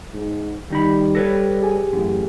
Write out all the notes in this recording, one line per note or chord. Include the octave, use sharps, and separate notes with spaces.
G#2
D#2 G3 D#4 B5
A4 B4 C#5 A#6
G4 G#4 G#5
A1 F#2